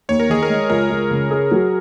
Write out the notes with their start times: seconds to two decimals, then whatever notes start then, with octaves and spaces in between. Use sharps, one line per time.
0.09 D#2 C#5
0.20 A#4
0.29 D#3 G#4
0.43 A#4
0.50 G#3
0.70 C#2 A#4
0.90 C#2
1.11 C#3
1.31 G#4
1.52 F#3